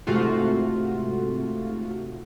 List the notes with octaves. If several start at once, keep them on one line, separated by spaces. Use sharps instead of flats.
G#2 C3 A3 F4 F#4